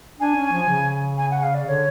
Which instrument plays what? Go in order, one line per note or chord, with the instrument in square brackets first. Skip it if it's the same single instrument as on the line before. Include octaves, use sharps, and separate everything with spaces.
[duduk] D4 [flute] G#5
[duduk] C#4
F3
C#3
[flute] G#5
F#5
F5
D5
[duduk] D3 [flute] C#5